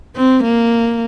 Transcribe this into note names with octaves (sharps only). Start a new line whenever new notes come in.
C4
A#3